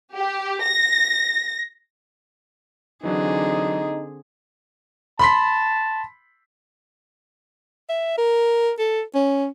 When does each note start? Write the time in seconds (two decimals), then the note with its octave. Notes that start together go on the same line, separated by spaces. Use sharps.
0.14 G4
0.63 A#6
3.03 D3 E3 F#3 C4 D4 D#4 G#4
5.19 A5 B5 C6 B6
7.89 E5
8.18 A#4
8.79 A4
9.15 C#4